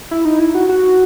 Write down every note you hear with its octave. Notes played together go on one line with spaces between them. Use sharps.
E4
D#4
E4
F#4
F#4